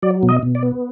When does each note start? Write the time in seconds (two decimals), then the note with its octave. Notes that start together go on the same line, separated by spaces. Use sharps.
0.03 F#3 D5
0.23 B2
0.29 D#5
0.43 B2
0.55 D5
0.63 B3